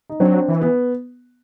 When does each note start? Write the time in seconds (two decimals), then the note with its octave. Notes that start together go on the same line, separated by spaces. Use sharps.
0.10 D#4
0.20 F#3 C4 D4
0.48 E3
0.61 B3